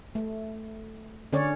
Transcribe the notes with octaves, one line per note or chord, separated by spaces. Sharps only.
A3
D3 C#4 C#5 D5